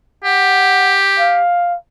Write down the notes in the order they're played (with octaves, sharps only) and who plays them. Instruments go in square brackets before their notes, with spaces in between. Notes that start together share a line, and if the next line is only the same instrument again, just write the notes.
[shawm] G4 [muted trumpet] F#5
[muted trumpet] F5